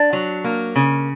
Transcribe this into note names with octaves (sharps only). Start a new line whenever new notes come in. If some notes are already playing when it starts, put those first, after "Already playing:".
Already playing: D4
F#3
A#3
C#3